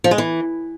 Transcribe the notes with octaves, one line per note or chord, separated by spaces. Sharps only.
F3
G#3
E3